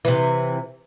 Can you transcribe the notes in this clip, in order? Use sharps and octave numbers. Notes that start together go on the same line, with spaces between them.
C3 E3